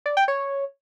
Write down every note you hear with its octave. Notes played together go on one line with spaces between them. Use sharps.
D5
G5
C#5